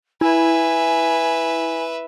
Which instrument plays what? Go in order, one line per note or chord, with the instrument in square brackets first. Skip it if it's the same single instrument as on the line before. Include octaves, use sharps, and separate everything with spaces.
[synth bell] E4 [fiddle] B4 E5 [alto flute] G#5